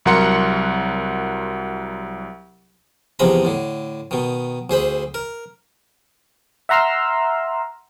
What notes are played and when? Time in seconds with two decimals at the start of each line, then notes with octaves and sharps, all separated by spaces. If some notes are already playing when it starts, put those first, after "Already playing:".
0.06 C2 F#3 A#4 F#5 C6 C#7
3.19 E2 C3 F3 G#3 A#5 B5
3.45 A2 D3
4.11 B2 D#3
4.70 D2 G#4 C5 B5
5.14 A#4
6.69 E5 F#5 A#5 C6 E6 F6